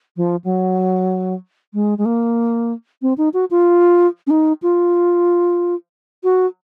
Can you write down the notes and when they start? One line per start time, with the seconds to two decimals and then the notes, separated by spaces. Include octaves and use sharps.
0.17 F3
0.44 F#3
1.74 G#3
1.98 G#3
2.05 A#3
3.02 C4
3.18 D#4
3.34 F#4
3.51 F4
4.27 C#4
4.30 D#4
4.62 F4
6.24 F#4